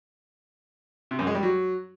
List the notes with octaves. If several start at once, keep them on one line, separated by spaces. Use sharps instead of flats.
C3
F#2
G#3
G3
F#3